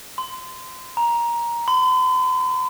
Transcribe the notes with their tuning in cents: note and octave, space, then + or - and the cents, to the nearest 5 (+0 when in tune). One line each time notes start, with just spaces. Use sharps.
C6 -25
A#5 +15
C6 -45